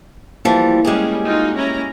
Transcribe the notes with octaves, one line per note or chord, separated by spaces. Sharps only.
E3 F3 G3 A#3
G3 G#3 C#4 G4 G#4
D#4 F4 F#4
C#4 E4 A#5